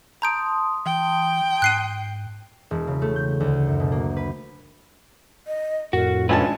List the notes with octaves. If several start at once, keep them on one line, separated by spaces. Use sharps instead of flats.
A5 A#5 C6 D#6 G6 D7
E3 G5
G#2 F#6 C7 D#7
E1
C#3
A3
G6
D2
F#2
B2
A#3
B4
D#5
F2 A2 F#4 A#4
G#1 C#4 D4 F4 B4 G#5 A5